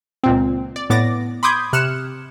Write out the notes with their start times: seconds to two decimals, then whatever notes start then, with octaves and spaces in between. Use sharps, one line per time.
0.23 C#2 A#2 C4
0.76 D5
0.90 A2 B3 D6 A6 A#6
1.43 B5 C6 D6 D#6 G6 G#6
1.73 C3 F6 F#6 C#7 E7